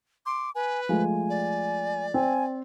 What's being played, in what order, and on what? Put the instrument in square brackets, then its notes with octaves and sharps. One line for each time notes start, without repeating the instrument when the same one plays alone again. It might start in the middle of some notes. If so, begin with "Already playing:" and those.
[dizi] C6 [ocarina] D6
[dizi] B4 [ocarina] G#5
[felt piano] F3 G#3 A3 [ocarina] G#5
[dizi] D5
[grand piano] C4 [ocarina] G#5